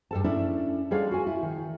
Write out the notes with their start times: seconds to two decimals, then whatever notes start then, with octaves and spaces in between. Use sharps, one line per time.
0.11 G2 A4 A5
0.24 C#4 D4 E4 A4
0.91 G3 G#3 G#4 A4 C#5 F5
1.11 F#4 G#5
1.27 E4
1.43 D#3